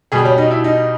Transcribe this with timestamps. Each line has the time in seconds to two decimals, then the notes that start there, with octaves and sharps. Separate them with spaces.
0.12 B2 G3 G#4
0.25 C#4
0.38 D#4
0.51 E4
0.64 D#4